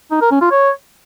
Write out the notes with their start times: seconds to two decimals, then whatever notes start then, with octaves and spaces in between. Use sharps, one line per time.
0.11 D#4
0.21 A#4
0.31 C#4
0.41 F4
0.51 C#5